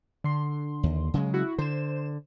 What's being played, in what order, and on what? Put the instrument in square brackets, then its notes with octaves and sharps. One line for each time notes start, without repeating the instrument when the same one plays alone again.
[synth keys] D3 C6
[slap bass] D#2
C#3 F#3 G#3
[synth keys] E4 F#4
[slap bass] D3 [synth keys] C5 E7